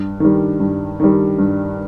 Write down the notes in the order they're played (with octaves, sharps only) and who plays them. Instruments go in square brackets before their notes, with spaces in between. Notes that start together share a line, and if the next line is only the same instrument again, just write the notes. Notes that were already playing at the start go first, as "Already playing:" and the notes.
Already playing: [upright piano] G2
D#3 G3
G2
D#3 G3
G2